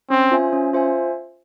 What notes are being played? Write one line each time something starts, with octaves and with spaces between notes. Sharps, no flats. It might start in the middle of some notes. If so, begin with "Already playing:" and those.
C4 C#4
F4 C5 E5 G#5
C#4
F4 C5 E5 G#5